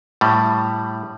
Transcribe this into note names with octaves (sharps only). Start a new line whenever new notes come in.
A2 G3